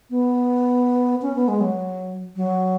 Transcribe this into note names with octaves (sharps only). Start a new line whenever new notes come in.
B3
C#4
B3
G#3
F#3
F#3